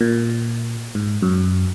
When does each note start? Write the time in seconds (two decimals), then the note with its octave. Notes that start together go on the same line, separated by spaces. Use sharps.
0.01 A#2
0.95 G#2
1.22 F#2